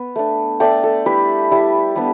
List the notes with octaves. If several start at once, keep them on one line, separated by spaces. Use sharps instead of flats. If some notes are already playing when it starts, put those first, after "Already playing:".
Already playing: B3 B4
A3 D4
A3 D4 D5 G5
A4
G3 E4 G4 B4
G3 E4
G3 B3 D4